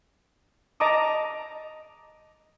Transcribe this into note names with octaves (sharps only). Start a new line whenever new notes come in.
D#5 A5 A#5 D6 D#6